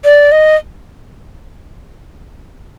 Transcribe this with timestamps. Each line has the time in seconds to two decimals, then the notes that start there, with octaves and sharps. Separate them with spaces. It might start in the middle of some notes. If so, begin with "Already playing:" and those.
0.04 D5
0.32 D#5